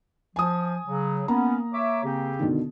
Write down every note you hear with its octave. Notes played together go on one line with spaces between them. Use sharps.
F3 G#5 D#6
C#3 F#3
A#3 B3 C#4 A#5
C#5 E5 D6
C#3 C4 G4
B2 D3 D#3